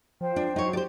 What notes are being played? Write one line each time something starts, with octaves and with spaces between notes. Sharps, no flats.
F3 C5 G5
D4
F#3 D#4 C#5
G4 C5 D5